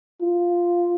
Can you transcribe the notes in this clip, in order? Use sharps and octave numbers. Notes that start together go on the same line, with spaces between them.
F4